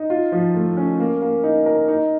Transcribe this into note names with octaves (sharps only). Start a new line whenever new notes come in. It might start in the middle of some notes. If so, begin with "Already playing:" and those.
Already playing: D#4
F4
F3
A3
C#4
A#3
A#3
D#4
A#4
D#4